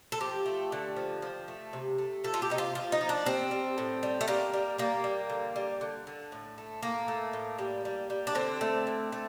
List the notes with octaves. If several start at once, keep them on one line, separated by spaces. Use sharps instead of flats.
A4
F3 G4
A3
D3
F3
F3
A3
C3
A3
F3 A4
F4
G4
C3 D#4
F4
F3 F4
D#4
F3
D4
G3 C4
G3
A2
G3
A3
G3 A#3
G3
G3 A#3
G3
D3
G3
D3
D3
A2
A3
A2 A#3
A3
A2
G3
G3
G3
D4
D3 C4
A3
D3
A3